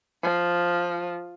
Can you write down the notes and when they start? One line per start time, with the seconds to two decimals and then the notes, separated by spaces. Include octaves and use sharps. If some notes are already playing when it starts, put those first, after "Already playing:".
0.23 F3